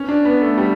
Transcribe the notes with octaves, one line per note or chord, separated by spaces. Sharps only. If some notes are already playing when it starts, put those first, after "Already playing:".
Already playing: C#4
D4
B3
A3
G3